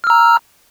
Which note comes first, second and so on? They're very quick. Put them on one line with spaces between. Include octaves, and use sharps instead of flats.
F6 E6 A#5